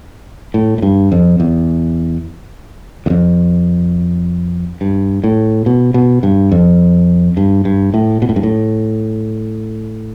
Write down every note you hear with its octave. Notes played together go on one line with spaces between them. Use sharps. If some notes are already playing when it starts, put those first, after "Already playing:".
A2
A2
G2
F2
E2
E2
F2
G2
A2
B2
B2
G2
F2
G2
G2
A2
B2
A2
G2
A2